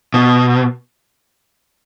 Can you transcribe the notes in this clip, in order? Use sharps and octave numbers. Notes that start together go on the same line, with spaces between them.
B2